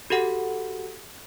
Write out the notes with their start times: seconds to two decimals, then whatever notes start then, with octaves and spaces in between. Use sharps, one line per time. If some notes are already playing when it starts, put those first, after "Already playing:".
0.10 F#4 G4 A4 F#5